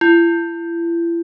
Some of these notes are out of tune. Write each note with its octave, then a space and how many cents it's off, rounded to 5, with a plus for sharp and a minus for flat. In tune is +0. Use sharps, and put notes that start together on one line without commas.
E4 +40